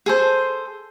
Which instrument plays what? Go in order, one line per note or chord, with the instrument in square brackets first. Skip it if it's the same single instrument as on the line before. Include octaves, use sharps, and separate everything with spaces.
[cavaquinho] G#4 A4 C5